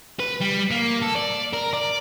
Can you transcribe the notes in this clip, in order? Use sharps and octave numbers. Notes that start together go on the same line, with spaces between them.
B4
G3
A#3
A4
D5
A#4
D5